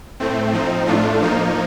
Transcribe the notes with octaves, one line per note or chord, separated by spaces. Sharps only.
A2 A3 C4
F3 C4 D#4
A2 A3 D4 F4
F3 A#3 D#4